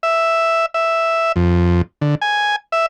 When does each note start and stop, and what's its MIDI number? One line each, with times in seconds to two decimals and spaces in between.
0.03 0.66 76
0.74 1.32 76
1.36 1.82 41
2.01 2.15 50
2.22 2.56 80
2.72 2.86 76